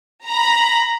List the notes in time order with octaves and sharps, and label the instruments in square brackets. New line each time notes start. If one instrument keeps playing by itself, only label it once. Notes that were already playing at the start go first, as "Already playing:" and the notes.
[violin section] A#5 B5